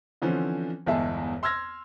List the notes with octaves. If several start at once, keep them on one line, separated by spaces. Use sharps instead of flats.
D3 E3 F3 C4 C#4
G1 E2 G#3 G#4 E5 A5
C6 E6 F6 G#6 A#6